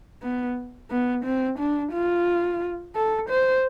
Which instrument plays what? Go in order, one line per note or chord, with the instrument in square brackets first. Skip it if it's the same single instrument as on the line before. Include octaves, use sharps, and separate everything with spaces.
[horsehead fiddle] B3
B3
C4
D4
F4
A4
C5